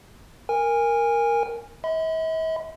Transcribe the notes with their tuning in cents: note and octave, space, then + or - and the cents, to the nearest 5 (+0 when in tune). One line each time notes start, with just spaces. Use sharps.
A#4 +0 G#5 -20
E5 -45 B5 +35